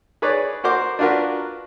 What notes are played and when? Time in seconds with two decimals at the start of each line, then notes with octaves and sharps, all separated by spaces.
0.22 G#4 B4 C#5 D5
0.64 F#4 A#4 C5 D6
0.99 D4 F4 F#4 A#4 B4